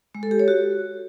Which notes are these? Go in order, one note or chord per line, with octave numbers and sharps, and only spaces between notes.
G#3
A4
G4
C#5
F#4